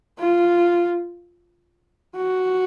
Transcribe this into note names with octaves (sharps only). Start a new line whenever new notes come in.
F4
F#4